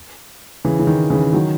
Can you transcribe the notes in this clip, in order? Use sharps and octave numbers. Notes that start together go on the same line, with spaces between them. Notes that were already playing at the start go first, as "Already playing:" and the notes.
C#3 E3
C#3
D#3
C#3 E3
D#3 F#3